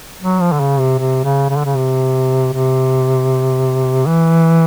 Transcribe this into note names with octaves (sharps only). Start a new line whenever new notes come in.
F#3
F3
D3
C#3
C3
C3
C#3
C#3
D3
C#3
C3
C3
E3